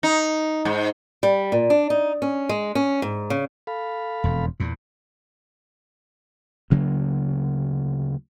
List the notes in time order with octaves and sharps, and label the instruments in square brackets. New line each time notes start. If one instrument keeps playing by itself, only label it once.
[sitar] D#4
G#2
[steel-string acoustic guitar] G3
A#2
D4
D#4
C#4
G#3
C#4
G#2
C#3
[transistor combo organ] A4 F5 B5
[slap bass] E1 F2
E2 A#2
D2 C#3 F#3 A#3